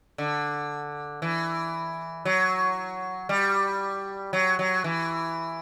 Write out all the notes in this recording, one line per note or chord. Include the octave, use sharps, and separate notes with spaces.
D3
E3
F#3
G3
F#3
F#3
E3